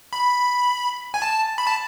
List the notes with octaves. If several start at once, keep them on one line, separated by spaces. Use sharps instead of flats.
B5
G#5
A5
B5
A5